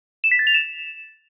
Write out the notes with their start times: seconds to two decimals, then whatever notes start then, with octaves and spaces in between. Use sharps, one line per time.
0.24 E7
0.31 B6
0.39 A6
0.47 F7
0.54 E7